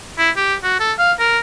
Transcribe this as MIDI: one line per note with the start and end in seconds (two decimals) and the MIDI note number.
0.18 0.30 64
0.37 0.55 67
0.64 0.76 66
0.80 0.93 69
0.99 1.13 77
1.19 1.39 70